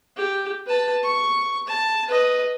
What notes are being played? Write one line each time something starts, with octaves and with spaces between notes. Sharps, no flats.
G4
B4 A5
C#6
A5
B4 D#5